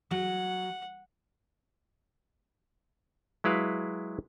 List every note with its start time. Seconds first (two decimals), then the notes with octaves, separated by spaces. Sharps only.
0.11 F#3 F#5
3.44 F#3 G#3 E4 B4 F5